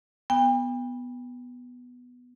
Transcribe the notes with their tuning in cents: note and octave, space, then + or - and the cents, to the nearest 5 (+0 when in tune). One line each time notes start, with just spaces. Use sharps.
B3 +0 G5 +40